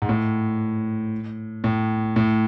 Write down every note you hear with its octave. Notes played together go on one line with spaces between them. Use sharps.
G#2
A2
A2
A2